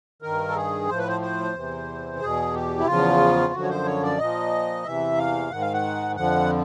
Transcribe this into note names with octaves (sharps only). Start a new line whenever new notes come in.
G2 D#3 A#4
A4
G#4
A2 F3 C5
B4
C5
C5
E2 C3 E3
E2 B2 G#4
G4
E4
E2 C#3 F3 F4
F#2 D3 F3 F#4
C#5
C5
C#5
D5
A#2 F3 D#5
E2 C3 E3 E5
F5
G#2 D#3 F#5
F5
F#5
F2 D3 F3 F#5